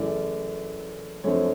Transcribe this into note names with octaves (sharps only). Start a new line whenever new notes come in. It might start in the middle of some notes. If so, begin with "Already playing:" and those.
Already playing: F#2 C#3 E3 A3 D5
F#2 D3 F3 A3 C4 C#5